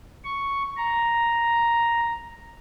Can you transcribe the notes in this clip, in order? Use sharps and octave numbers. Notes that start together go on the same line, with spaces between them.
C#6
A#5